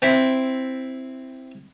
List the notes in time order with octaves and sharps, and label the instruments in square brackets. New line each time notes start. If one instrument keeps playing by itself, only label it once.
[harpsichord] C4 E4